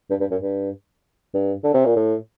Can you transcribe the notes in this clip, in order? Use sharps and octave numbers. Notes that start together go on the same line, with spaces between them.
G2
G2
F#2
G2
G2
D3
C3
A#2
A2